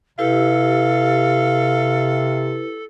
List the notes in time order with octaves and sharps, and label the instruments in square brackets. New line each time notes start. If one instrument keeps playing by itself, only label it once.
[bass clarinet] C3 [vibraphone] E4 G4 B4 [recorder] A4 [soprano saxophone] F5